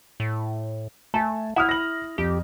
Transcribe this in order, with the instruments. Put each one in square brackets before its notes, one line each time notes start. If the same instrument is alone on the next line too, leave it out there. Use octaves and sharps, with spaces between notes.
[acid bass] A2
[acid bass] A3 [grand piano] G#5 A5
[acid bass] E4 [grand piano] F#5 D#6 F6
[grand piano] A#6 F#7
[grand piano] F2 [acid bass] G4